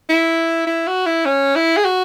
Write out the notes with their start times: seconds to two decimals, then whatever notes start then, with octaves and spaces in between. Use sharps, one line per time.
0.09 E4
0.67 E4
0.88 F#4
1.06 E4
1.25 C#4
1.56 E4
1.77 G#4
1.85 F#4